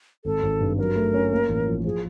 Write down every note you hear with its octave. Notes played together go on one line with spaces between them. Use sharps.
G#1 A4
G#1
G2
F#3 A#4
A3
C#4
A#3
A1
F3
F3 G#4